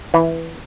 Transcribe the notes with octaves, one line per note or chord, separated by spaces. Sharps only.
E3